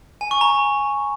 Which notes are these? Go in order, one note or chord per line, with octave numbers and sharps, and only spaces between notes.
G#5
C#6
A#5